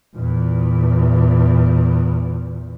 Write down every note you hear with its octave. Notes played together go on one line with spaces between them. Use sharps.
E2 A#2